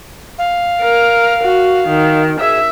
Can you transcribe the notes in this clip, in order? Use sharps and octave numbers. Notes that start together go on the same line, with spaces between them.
F5
A#4
F#4
D#3
G#4 E5